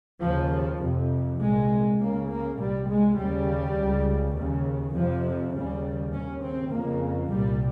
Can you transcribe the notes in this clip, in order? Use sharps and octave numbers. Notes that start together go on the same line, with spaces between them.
D#2 C#3 F3
F2 C3
C2 A#2 G#3
C#2 C#3 A#3
A#3
C2 A#2 G3
G#3
D#2 C#3 G3
C#2 C#3
D#2 C#3
F2 C3 F3
D#2 C#3 G3
D#2 C#3 C#4
C4
F2 C#3 A#3
C2 A#2 G3